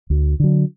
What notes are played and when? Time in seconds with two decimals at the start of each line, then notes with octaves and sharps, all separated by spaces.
0.10 D2
0.40 D3 F#3